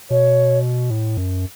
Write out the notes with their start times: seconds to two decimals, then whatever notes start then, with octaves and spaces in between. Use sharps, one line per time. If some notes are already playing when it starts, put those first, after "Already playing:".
0.10 B2 C#5
0.90 A2
1.17 F#2